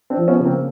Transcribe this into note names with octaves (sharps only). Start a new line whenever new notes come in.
C4 D4
F3
B3 C#4
C#3
A#3 C4